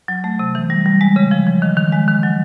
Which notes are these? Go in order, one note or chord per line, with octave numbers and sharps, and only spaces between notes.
F#3
A3
C3
E3
G3
G3
G#3
C#3
F3
F3
D#3
D#3
G#3
D#3
F#3